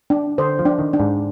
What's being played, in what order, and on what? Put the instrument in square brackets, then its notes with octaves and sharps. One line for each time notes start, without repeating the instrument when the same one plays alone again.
[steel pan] D4
[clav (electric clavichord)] D3 [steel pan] C5
[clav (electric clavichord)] F3
[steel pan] D4
[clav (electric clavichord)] D#3
[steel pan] D4
[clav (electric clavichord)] G#2